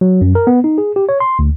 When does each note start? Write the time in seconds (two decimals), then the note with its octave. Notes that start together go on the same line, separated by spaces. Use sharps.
0.01 F#3
0.21 F#2
0.35 A#4
0.47 B3
0.64 D#4
0.78 G#4
0.96 G4
1.09 C#5
1.20 C6
1.39 D2